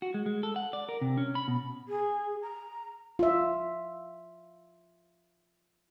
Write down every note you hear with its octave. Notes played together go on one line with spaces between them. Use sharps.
F#4
G#3
G#3
A4
F#5
D5
A#4
C3
C#4
B5
B2
G#4
A#5
F4 E5